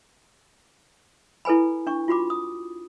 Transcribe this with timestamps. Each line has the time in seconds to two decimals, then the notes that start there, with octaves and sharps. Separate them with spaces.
1.45 E4 A4 B4 G#5 B5
1.87 D4 C#6
2.08 F4 F#4 B5 D6
2.30 D#6